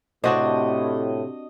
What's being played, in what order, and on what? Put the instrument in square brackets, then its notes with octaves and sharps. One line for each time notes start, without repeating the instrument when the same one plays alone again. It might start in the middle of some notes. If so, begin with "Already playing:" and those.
[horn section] A2 [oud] C3 [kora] D4 F#4 C5 [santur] D#5